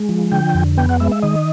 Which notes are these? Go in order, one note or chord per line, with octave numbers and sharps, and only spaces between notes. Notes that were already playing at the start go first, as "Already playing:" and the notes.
Already playing: G#3
F3
D3 G5
F2
B3 G5
F#5
G#3 E5
E5
D#3 D#5